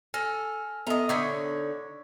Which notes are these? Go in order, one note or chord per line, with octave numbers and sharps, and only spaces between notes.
A4 G#5 F6 A#6
B3 A4 D#5 E5 A#5
D3 D#4 C#5 C#6 G#6 B6